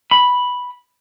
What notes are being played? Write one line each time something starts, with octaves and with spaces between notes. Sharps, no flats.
B5